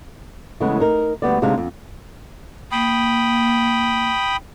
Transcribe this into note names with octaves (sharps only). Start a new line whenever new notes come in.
C#3 E3 G#3 A3 B3
D#4 A#4
D2 G3 B3 D5
D2 C3 G#3 D4 D#4 F5
F2
A#3 G5 B5 D#6